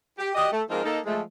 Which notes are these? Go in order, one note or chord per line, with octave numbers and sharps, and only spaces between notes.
G4
F#4 G4 D5 D#5
A3
F3 G#3 A#3 C4 D#4 A#4
A#3 D#4 A4
F3 G#3 A3